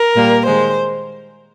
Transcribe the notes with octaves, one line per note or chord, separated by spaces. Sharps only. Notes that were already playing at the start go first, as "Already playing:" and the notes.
Already playing: A#4
A#2 G3 A#3
D#3 G#3 C5